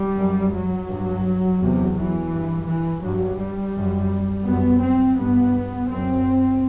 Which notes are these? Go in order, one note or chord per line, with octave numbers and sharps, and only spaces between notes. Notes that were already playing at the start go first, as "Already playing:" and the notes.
Already playing: G3
F#2
F#3
G2
E2 C3
E3
G2
E3
G2 F#3
G3
F#2
F#2 B3
C4
G2 B3
F#2 C4